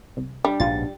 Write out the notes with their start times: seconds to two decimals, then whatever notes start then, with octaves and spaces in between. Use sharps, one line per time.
0.17 C2
0.45 G3 D4
0.60 A#1 G#2 B2 F4 A6